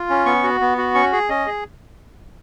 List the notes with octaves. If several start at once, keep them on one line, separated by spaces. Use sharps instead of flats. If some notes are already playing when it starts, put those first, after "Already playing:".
Already playing: F4
C#4
B3 C#6
F#4
B3
F#4
C#4 C#6
G#4
C#4 D#5
G#4